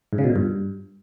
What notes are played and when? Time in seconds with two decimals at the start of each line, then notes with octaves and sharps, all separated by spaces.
0.13 G#2
0.18 C#3
0.24 B2
0.30 A#2
0.36 G2